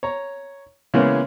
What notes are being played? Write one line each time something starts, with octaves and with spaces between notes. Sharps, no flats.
C#5 A#5
C#3 E3 G#3 A#3 B3 C#4